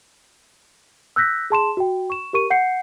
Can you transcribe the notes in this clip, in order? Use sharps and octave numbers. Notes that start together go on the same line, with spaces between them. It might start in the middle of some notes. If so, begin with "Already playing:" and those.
E6 F#6 G6 A#6 B6
G#4 A5 C6 E7
F#4 G5
C#6 E7
G4 A#4 C#6 D#7
F#5 G6 C7 C#7